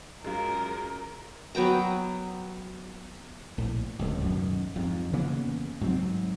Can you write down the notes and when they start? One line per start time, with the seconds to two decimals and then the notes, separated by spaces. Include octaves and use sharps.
0.24 F#2 G#3 F4 A#4
1.55 F#3 B3 G5 A#5
3.58 A#1 A2
3.99 D1 C#2
4.25 F#2 B2 D#3
4.76 F2 G#2
5.13 C#3 E3 A#3 B3
5.81 G#2 F#3 C4